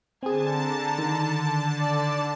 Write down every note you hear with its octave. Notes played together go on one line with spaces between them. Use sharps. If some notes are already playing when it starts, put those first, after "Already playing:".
D3 C4 G#4 G#5 A5
A#5
D#3
D5